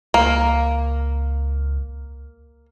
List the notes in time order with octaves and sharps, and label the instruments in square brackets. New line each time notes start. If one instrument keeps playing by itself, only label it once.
[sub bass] C#2 [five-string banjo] A#3